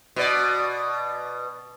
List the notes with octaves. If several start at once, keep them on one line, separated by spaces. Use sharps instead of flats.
B2 D5